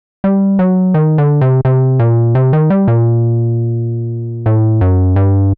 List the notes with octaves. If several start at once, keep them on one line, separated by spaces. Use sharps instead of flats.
G3
F#3
D#3
D3
C3
C3
A#2
C3
D#3
G3
A#2
A2
F#2
G2